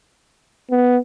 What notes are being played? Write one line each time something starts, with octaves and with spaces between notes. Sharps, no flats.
B3